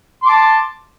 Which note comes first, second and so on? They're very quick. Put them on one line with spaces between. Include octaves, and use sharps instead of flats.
C6 D6 A5